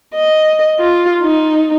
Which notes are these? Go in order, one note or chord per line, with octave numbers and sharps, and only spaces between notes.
D#5
F4
D#4